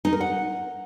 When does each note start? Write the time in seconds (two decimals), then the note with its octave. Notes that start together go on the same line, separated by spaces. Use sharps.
0.05 D#4
0.13 A#4
0.20 F#5